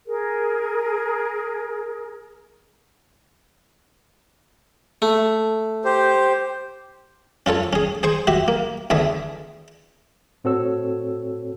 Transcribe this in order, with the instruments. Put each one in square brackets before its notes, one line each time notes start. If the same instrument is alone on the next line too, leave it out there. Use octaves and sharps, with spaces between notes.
[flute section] G#4 A#4
[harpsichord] A3
[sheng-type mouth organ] G4 C5
[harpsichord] C#4 F4 A4 C#5
C#4 G#4
G#4 C5 C#6
F#4 G4 E5
A#3
E2 D3 G#4 E5
[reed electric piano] A2 C4 F#4 A4 C#5 E6